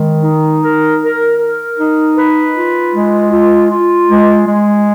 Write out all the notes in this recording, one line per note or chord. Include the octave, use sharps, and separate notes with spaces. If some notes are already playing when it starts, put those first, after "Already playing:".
Already playing: D#3 G#3
D#4
A#4
A#4
A#4
D#4
B4
F4
G#3
F4
F4
G#3
G#3